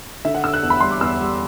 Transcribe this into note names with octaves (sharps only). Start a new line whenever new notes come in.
D3 E5
F#5
D3 E6
F#6
E2
B5
G3 C6
D6
E2 E6
G3